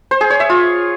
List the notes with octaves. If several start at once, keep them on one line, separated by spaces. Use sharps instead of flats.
C5
G#4
C#5
E5
F4